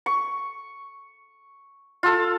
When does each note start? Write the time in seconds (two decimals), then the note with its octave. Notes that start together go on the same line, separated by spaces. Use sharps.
0.06 C#6
2.03 F4 A4